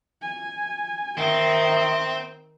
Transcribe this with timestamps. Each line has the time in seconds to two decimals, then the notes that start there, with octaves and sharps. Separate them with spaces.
0.22 G#5
1.17 D#3 C4 E5 G5